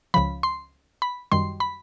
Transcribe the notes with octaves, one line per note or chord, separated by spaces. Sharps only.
C#2 C#3 F3 B5
C6
B5
F#2 D#3 G3 C6
B5